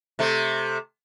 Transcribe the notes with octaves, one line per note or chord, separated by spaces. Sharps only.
C3 A3